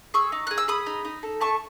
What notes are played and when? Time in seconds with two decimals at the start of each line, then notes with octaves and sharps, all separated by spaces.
0.14 G#4 C#6 E6
0.32 D#4
0.47 G#4 F#6
0.58 E6
0.68 G#4 B5 D#6
0.86 D#4
1.05 D#4
1.23 A4
1.41 A3 A5 C#6